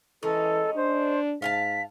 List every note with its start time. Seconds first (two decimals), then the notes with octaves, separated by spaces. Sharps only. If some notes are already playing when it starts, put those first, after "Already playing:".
0.23 E3 G#3 C#4 D#4 A4
0.76 D4 C5
1.42 G#2 F5 G#5 A5 B6